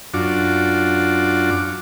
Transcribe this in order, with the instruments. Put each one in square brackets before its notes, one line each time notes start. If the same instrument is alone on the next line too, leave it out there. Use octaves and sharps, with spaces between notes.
[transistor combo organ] F#2 D4 F4 F#4 D6